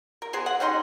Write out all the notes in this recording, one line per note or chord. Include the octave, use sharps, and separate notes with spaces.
A#4
B3 G#4 C5
F#5
G3 C#4 D#4 C6